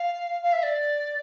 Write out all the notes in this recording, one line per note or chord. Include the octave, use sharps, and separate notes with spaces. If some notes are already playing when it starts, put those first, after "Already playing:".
Already playing: F5
F5
E5
D5